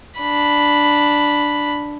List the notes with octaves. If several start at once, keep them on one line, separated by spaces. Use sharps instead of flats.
D4 B5